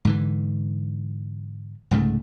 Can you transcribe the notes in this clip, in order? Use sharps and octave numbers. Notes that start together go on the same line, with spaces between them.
G#2 D3 E3
C2 G#2 C#3 A3